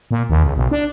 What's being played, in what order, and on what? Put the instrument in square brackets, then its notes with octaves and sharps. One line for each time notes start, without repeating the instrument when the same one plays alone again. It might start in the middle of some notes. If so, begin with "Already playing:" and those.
[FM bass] A#2
D#2
C#2
B1
D4